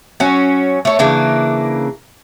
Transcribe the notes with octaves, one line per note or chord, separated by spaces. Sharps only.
F#3 C#4
A3 C#5
C#3 E3 A#3 D4